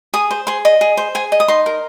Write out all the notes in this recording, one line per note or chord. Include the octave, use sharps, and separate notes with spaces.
G#4 D#6
C5
G#4 C6
D#5
G#4
C5
G#4 G#5
D#5
D#6
D#4 C6
A#4